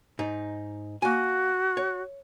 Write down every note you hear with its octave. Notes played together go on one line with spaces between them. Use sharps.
G#2 D#4
A#3 F#4 G#5
C#5